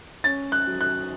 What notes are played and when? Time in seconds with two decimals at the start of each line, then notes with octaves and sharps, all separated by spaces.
0.24 C#4 A6
0.52 F#6
0.67 F#3
0.81 F#6